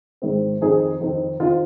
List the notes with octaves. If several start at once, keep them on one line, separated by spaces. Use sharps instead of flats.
G#2 D#3 C4
F2 D#3 C4 D#4 G#4
F2 D#3 C4 D#4
D#3 C4 D#4 F4